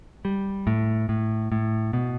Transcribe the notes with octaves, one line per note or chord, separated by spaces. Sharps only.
G3
A2
A2
A2
B2